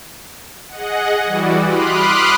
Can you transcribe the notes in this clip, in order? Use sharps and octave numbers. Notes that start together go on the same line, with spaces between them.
G#4 D#5 F#5
E3 G3 F#4 D5
B5 C6 D6 D#6 F6 F#6